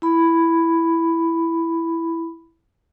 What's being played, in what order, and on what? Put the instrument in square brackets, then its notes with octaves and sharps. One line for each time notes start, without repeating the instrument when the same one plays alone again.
[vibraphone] E4 B5